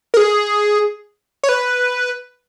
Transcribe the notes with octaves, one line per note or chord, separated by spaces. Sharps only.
A#4
G#4
C#5
B4